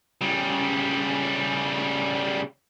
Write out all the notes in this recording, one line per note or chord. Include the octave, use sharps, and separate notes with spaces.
C#3 G3